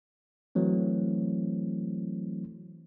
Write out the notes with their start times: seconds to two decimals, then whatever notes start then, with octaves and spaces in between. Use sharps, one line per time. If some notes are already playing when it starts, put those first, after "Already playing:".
0.55 E3 F#3 A3 C4